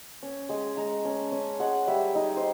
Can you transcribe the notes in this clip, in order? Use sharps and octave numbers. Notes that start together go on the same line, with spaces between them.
C#4
G#3 G#5
G#3 A#5
C#4 A5
C#4 G#5
G#3 F#5
G3 E5
D#4 D#5
C5